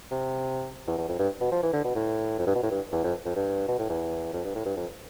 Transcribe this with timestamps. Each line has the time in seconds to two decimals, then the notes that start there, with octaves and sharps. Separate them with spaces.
0.11 C3
0.87 E2
0.98 E2
1.08 F2
1.19 G2
1.41 B2
1.52 F3
1.63 E3
1.73 D3
1.84 B2
1.95 A2
2.38 F2
2.47 G2
2.55 B2
2.63 A2
2.71 G2
2.92 E2
3.04 F2
3.25 F2
3.35 G2
3.68 B2
3.79 A2
3.89 E2
4.33 F2
4.44 G2
4.55 A2
4.66 G2
4.77 F2